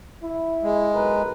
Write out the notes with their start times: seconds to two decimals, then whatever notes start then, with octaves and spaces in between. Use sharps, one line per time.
0.23 E4
0.63 G#3
0.93 B1 A#4 B4